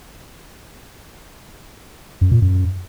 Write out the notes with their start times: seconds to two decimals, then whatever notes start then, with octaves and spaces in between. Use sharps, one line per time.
2.21 F#2
2.32 A#2
2.42 F#2